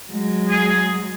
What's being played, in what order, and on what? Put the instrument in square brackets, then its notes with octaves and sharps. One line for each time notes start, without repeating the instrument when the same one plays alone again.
[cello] F#3 G#3
[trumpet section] G#4